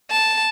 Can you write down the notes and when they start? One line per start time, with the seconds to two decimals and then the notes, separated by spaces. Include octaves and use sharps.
0.11 A5